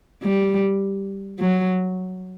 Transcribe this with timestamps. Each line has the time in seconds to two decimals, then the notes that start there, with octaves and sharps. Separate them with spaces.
0.23 G3
1.39 F#3